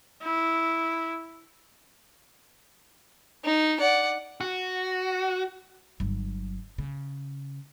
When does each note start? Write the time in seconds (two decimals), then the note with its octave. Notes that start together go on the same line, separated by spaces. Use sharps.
0.23 E4
3.44 D#4
3.80 D5 F#5
4.41 F#4
6.00 G1 F#3
6.78 C#3